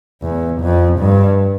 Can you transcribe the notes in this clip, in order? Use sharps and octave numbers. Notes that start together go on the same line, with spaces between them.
E2
F2
G2